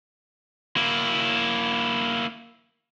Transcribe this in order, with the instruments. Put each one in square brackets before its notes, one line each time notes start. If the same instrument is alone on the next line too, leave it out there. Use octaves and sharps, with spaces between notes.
[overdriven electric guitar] A#3 E4